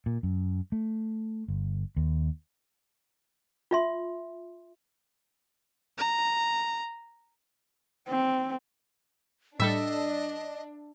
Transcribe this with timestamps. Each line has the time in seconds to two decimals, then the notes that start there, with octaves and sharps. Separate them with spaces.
0.06 A#2
0.23 F#2
0.72 A3
1.48 G1
1.97 D#2
3.71 F4 E5 C6
5.98 A#5
8.08 C4
9.60 A2 G3 D4 A4 D#5 E5